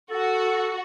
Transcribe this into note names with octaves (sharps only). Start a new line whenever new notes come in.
F#4 A4